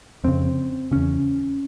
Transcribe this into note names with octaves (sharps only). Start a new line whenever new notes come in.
F2 C#3 C4
E2 C#3 C#4